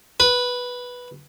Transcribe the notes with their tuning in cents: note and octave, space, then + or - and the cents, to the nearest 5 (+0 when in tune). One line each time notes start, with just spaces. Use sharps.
B4 -5